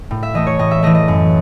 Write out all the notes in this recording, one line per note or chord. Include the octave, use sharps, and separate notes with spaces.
A2
E5
E3 A3 D#5
C#5
A2 D#5
E5
E3 A3 D#5
D#5
F#2